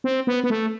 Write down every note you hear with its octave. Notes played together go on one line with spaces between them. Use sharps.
C4
B3
B3
A3